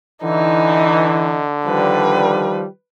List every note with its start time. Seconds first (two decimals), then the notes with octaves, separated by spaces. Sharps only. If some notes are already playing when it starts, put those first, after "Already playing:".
0.23 D3 E3 D#4
1.66 D#3 F3 G3 B4